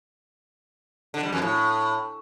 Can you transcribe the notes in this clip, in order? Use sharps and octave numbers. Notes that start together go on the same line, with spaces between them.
D3
G3
F2
A2